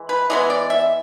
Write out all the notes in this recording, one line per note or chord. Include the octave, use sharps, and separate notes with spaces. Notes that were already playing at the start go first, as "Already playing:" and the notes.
Already playing: E3 G#3
B4
E3 G#3 B3 D#5
D5
E5